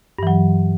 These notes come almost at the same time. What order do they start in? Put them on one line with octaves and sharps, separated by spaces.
G2 E3 F#3